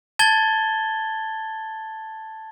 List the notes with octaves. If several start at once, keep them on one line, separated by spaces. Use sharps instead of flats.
A5 G#6 A6 G7